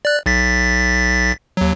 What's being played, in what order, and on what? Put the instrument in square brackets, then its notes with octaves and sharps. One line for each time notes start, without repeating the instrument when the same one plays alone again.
[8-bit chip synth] D5 F#6
B1 A6 B6
D#2 F#3